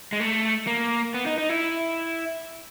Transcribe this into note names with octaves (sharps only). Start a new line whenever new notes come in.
G#3
A3
A#3
B3
D#4
D#4
E4